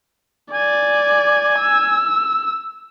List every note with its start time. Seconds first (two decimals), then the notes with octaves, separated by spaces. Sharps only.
0.53 D5 G#5
1.60 E6